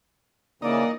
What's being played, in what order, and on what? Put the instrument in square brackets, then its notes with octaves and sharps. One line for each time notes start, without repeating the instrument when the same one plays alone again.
[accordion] C#3 E3 [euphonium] A#3 [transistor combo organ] D#4 [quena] D5